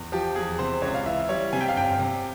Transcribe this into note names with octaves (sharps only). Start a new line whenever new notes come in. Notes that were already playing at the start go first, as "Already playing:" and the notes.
Already playing: E2
F3 G4
E2 G#4
C3 C5
C#2 C#5
F5
E3 E5
G3 C#5
C3 G#5
G5
F5
G1 G5
C3